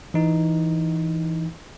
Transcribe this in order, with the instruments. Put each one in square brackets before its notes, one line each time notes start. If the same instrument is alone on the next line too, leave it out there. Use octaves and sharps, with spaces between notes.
[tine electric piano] E3 D#4